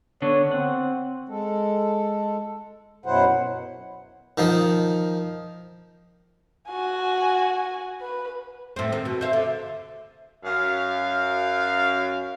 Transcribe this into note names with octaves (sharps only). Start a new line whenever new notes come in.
D3 B3 D4 C#5
C4 F#5
G#3 A4
F#2 B2 F#3 E4 C5 F#5
D#3 F3 D#4
F#4 G#5
B4
A2 C4
D#3 C4
B2
C5 E5 F5
D3
F#2 F5